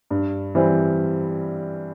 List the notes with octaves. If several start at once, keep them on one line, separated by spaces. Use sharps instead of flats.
G2
E3 G3 C4